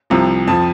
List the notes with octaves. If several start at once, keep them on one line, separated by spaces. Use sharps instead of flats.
C2 C3 F3
F2 F3 A5